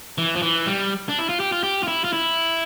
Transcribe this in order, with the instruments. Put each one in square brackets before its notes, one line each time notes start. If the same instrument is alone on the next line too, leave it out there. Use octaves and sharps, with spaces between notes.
[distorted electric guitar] E3
F3
E3
G3
D4
E4
F4
G4
F4
G4
F4
E4
F4
E4